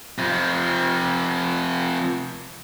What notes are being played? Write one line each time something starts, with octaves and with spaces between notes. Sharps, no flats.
C3 F3